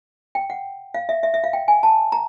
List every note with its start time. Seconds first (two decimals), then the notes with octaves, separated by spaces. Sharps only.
0.35 G5
0.50 F#5
0.94 F5
1.09 E5
1.23 E5
1.34 E5
1.44 F5
1.53 G5
1.68 G#5
1.83 A5
2.12 A#5